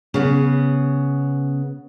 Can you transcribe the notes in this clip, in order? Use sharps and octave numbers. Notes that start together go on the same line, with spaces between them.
C#3 B3